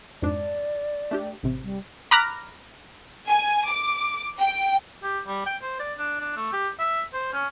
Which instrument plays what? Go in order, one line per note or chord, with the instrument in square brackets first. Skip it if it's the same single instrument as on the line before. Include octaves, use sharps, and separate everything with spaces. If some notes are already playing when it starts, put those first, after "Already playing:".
[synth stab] F2 G#2 D4 [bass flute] D5
[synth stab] A3 D4 G4
A1 C3
[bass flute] G3
[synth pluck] A#5 B5 D6 F6 F#6 A#6
[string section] G#5
D6
G5
[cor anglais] G4
G3
G5
C5
D5
D4
D4
A3
G4
E5
C5
C#4